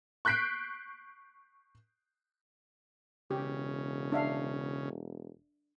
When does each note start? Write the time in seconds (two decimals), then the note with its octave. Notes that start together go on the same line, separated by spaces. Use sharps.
0.25 C#6 F#6 G6 B6 C7 D7
3.31 E1 C#3 G4
4.12 D4 E5 F5